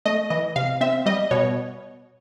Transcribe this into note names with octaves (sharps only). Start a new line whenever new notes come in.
A3 D#5
E3 D#5
C3 F5
C4 E5
G3 D#5
B2 C#5